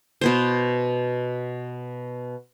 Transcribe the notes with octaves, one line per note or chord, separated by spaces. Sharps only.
B2 B3 C5